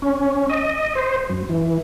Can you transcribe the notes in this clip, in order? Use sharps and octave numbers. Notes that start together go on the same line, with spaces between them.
C#4
D#5
C5
F#2
E3